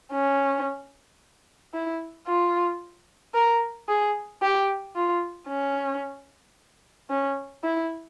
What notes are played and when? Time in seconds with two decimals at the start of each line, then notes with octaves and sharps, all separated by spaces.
0.13 C#4
1.74 E4
2.27 F4
3.34 A#4
3.88 G#4
4.42 G4
4.95 F4
5.49 C#4
7.10 C#4
7.64 E4